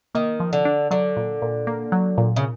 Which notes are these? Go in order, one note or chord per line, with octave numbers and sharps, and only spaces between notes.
D#3 A#3
F3
D3
D4
D3 F#3
A#2
A#2
A#3
F#3
A#2
C#3